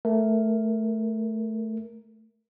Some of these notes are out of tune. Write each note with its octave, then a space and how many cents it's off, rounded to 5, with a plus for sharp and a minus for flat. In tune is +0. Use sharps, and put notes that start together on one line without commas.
A3 +0 A#4 +0